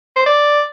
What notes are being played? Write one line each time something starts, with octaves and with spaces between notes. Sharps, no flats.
C5
D5